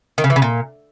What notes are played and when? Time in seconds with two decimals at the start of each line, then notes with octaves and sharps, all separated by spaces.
0.18 D#3
0.24 C#3
0.30 E3
0.36 C#3
0.42 A#2